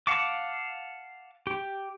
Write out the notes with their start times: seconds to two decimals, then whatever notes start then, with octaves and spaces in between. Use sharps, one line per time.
0.07 F5 F#5 A5 D6
1.47 G4